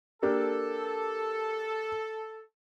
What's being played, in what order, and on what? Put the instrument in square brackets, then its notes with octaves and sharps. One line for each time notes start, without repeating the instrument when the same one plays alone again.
[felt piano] A#3 D4 G4 [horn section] A4